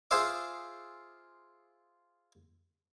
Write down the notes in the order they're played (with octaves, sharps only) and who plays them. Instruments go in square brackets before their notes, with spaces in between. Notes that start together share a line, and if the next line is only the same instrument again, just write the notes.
[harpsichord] F4 G#4 C5 E5 D6